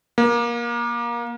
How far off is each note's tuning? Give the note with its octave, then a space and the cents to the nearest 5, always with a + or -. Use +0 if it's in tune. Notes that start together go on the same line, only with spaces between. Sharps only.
A#3 +25